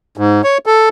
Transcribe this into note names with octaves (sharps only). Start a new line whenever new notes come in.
G#2
C#5
A4